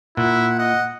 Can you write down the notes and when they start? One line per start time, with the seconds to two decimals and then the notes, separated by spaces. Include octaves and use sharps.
0.17 A#2 E4 F#5
0.59 D#5 F#5